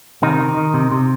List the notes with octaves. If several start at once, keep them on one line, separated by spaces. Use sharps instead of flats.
C3 D#3 D#4
D#3
D#3
C3
C3